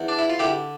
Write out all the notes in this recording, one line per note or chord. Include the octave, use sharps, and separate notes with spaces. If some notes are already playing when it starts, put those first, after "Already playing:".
Already playing: E2
D4
E4
F4
D3 E4 G4